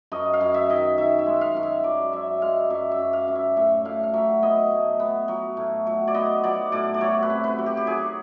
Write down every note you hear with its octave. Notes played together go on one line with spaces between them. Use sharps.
F#2 D#5
F5
F#2
E5
D#3 D#5
E5
D#3 E5
E5
G#3
F5
F#2 F5
E5
F#2 D5
F#2 E5
G#3 F5
F#2 E5
E5
F#2
F5
F#2
E5
A2 E5
A2 F5
F5
F#3 E5
B3 D#5
A2
B3
F#3
A2
F#3
D5
B3 D#5
F#3 D5
A2 D5
D5
F#3 C#5
B4
C3
B4
F#3
G4
G4
F#3 G#4